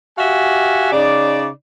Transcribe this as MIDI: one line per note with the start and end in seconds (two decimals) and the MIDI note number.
0.18 0.91 66
0.18 0.91 67
0.18 0.91 76
0.18 0.91 77
0.18 0.91 80
0.93 1.49 49
0.93 1.49 63
0.93 1.49 74